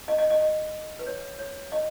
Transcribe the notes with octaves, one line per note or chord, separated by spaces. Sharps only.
D#5
D#5
D#5
D#5
B4
C#5
C#5
D#5